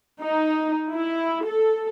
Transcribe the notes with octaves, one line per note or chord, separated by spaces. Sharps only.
D#4
E4
A4